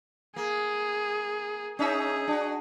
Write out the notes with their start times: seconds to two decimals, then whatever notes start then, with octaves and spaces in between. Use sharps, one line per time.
0.36 A#3 G#4
1.79 C#4 D#4 G#4 E5
2.28 D4 F#4